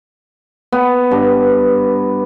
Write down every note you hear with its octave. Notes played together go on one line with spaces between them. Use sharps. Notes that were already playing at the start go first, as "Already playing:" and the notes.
B3
G2